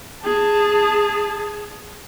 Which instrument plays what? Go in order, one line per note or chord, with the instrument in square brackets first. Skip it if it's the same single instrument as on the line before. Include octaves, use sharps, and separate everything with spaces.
[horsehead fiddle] G#4 A5